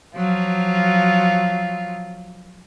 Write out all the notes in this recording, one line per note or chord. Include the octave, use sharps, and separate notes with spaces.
F3 F#3 F4